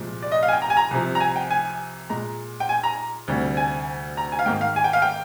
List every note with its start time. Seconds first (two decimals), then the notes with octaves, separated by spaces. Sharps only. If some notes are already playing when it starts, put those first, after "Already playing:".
Already playing: C2 A#2 F3 G#3
0.22 D5
0.32 D#5
0.43 F5
0.48 G#5
0.53 G5
0.62 A#5
0.70 G#5
0.77 A#5
0.91 C2 C3 F3
1.15 A#5
1.20 G#5
1.36 G5
1.50 G#5
2.10 A#2 G#3 A#5
2.60 G5
2.69 G#5
2.83 A#5
3.28 D2 C3 G3
3.57 G#5
4.17 A#5
4.32 G#5
4.39 F5
4.46 G#2 D#3 A#3 G5
4.61 F5
4.76 G#5
4.84 G5
4.93 F5
5.02 G5